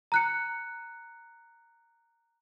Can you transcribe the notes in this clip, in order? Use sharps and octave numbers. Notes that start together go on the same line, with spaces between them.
A#5 F#6 C#7